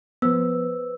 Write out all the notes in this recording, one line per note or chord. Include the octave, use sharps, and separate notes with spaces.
F3 B3 B4 C5 E6